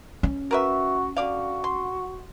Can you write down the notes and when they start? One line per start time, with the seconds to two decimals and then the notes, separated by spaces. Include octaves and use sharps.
0.23 C#4
0.51 F#4 A#4 B4 E5
1.17 D3 F#4 D5 F5
1.64 C6